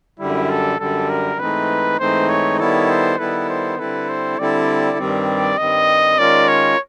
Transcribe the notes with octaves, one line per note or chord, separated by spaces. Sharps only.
F#2 D3 G3 E4
A4
F#2 D3 G3 A4
A#4
G#2 E3 A3 C4 D#4 B4
G#2 E3 A3 C4 D#4 C5
C#5
D#3 G3 B3 E4 A4 C#5
C5
D#3 G3 B3 E4 A4 B4
C5
D3 G3 C4 E4 A4 B4
C5
D3 G3 C4 E4 A4 D5
G2 D#3 G3 C4
G2 D#3 G3 C4 D#5
D#3 G#3 C#4 F4 A#4 D5
C#5